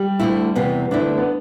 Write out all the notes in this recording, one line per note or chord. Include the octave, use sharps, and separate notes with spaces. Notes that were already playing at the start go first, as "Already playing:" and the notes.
Already playing: G3
D2 D3 A3 E4
E2 C3 E3 B3
D2 D3 A3 D4 E4
B3